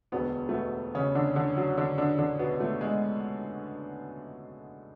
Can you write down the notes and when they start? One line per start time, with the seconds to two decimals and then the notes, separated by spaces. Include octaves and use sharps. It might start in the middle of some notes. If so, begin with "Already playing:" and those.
0.12 E1 D2 B2 D3 B3
0.49 A3
0.54 B2 B3
0.95 C#3 C#4
1.15 D3 D4
1.36 D3 D4
1.57 F#3 F#4
1.77 D3 D4
1.98 D3 D4
2.18 D3 D4
2.39 B2 B3
2.60 A3
2.81 G#3